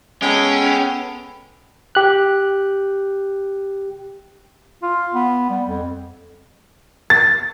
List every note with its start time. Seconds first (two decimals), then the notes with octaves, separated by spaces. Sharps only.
0.22 G#3 B3 C#4 A4 G5
1.95 G4 F#6
4.82 F4
5.14 B3
5.50 G3
5.67 F2
7.10 A6